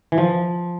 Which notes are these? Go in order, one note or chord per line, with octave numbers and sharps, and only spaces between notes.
E3
F3